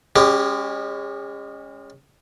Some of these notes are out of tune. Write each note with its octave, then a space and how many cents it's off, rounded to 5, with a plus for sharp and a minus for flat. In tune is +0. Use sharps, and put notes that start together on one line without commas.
G#3 -35 C#4 +0 G4 -5